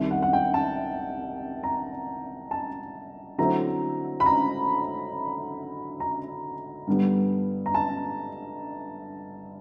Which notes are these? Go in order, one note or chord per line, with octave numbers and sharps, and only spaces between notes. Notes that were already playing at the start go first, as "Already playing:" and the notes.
Already playing: C2 C3 D#3
F#5
F#5
G5
A5
A#5
A5
D3 F#3 A3 C4 E4 A#5
B5
A#5
A#5
G2 D3 G3 B3
A#5
A5